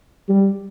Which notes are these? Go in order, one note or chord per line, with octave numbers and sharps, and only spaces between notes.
G3